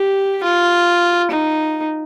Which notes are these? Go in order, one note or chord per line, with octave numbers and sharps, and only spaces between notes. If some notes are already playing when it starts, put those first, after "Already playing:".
Already playing: G4
F4
D#4